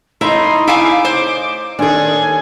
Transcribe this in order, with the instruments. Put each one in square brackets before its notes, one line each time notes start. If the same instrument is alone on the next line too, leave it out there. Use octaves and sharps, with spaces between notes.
[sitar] A2 D#4 [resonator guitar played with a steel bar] E4 [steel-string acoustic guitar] A#5 [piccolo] C6
[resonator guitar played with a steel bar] E4 F5 G#5 [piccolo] D6
[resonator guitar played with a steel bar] C5
[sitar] D#2 G#4 [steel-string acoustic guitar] D4 A4 [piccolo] G#5